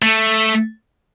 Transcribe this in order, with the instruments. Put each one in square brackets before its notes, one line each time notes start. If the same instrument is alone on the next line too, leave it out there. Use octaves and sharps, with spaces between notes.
[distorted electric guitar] A3